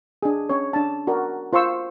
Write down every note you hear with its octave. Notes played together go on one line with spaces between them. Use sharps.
D4 G#4
C#4 C#5
D4 A5
F#4 A#4 D5
F4 C5 C6 C#6 E6